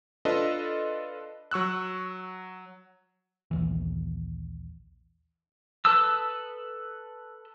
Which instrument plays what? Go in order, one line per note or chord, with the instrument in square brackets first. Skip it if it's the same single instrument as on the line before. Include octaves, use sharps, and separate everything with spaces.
[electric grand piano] D4 F4 A4 B4 D#5
F#3 C#6 E6 F#6
[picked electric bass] A#1 D#2 E3
[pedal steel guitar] A4 B4 A5 D#6 E6